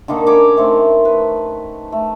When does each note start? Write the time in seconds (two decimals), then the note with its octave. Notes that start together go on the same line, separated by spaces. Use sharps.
0.08 D3 D#3 A#3 D#4
0.27 C#4 C#5 B5 D6
0.57 D#3 A3 C4 C#6
1.05 B4
1.92 A3